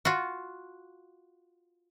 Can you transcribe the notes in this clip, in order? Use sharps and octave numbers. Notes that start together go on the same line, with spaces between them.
F4 F#4